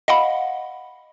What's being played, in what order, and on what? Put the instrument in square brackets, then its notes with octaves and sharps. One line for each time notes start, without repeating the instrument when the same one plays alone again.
[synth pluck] D#5 F5 F#5 B5